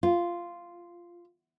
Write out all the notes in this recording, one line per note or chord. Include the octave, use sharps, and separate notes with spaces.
F4